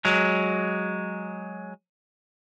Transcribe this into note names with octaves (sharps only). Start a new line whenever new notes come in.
F#3 G#3